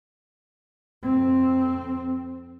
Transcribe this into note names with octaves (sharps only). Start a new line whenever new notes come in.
F2 C4